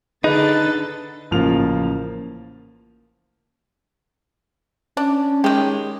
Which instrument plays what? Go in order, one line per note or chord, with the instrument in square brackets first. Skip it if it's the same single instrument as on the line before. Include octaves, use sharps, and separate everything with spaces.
[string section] D3 A4 A6 [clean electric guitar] D#4 [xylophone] G#4 [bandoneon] B4
[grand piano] A1 C#3 F3 A#3 F4 F7
[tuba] C#4 [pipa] D4
[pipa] D#3 G4 [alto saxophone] G#3